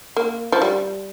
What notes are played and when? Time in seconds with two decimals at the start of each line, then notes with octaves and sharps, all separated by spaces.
0.16 A#3
0.52 F3
0.62 G3